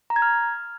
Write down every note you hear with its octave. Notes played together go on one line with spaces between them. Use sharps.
A#5
G#6
F6